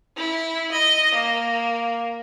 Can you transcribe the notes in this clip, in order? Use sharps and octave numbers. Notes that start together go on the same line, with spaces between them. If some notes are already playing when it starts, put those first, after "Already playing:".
E4
D#5
A#3